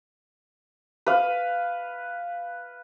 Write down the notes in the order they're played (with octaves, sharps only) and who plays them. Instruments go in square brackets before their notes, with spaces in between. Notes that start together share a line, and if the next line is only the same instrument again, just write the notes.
[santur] B4 F5